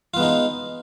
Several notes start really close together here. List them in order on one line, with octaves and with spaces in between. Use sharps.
F4 B3 G#3 D#4